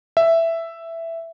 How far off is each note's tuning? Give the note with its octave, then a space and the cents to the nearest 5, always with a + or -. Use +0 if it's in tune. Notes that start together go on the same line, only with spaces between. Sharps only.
E5 +5